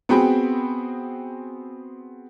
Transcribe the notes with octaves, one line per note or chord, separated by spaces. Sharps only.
B3 C4 F#4 G#4 G5 B5